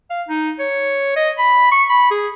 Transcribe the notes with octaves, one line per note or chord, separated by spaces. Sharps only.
F5
D#4
C#5
D#5
B5
C#6
B5
G#4